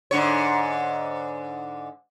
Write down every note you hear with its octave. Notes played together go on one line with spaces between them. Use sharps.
G#2 D3 C#5